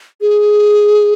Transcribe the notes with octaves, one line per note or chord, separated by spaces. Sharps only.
G#4